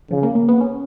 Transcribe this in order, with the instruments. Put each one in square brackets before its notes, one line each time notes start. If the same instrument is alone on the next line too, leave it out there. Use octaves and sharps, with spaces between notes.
[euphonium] C#3 [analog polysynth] F3
[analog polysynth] A#3
A#3
B3
C#4